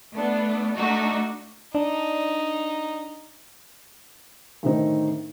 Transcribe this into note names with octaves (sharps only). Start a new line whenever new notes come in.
A3 B3 D4
A3 D4 D#4 F#4
D4 D#4
A2 D3 D#3 A3 C4 D#4